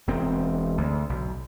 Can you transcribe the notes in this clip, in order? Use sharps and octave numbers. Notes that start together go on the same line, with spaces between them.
E1 C4
D2
B1